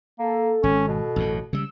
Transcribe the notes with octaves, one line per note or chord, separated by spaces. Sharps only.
A#3 A4
G#1 C#4
B2
A1 F#2 A2
C#3 G3 E6